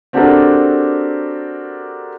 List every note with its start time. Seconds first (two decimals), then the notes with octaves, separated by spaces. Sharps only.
0.13 C4 D4 F#4 G4 A4 A#4